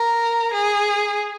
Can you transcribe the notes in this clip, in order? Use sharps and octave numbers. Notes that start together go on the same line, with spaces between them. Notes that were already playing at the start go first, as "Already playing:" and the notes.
Already playing: A#4
G#4